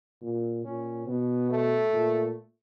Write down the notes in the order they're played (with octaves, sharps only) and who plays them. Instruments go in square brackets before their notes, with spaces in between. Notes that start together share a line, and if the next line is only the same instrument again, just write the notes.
[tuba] A#2
[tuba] A#2 [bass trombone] C#4
[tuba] B2 [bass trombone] B3
[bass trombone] A3
[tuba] A#2